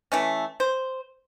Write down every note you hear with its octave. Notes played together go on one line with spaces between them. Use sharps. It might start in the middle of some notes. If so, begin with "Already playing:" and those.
E3 A3 C#4
C5